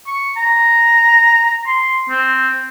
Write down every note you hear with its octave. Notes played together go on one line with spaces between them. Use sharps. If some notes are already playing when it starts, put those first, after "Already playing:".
C#6
A#5
C6
C4